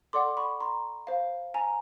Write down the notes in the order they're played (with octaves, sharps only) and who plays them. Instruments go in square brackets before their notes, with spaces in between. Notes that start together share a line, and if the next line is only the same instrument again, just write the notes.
[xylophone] A4 D5 F#5 C6 D6
B5 C#6
A#5 C6
C5 F5
G#5 A#5